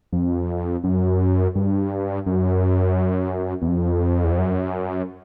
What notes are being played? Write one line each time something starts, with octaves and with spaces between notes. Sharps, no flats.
F2
F#2
G2
F#2
E2
F2
E2
F2
F#2